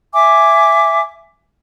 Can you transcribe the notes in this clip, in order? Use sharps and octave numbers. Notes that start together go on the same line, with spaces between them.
E5 G#5 D6